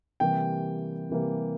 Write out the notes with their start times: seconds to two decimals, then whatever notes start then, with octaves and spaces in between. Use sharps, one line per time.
0.20 C3 E3 G3 A#3 G5
1.10 C3 E3 G3 A#3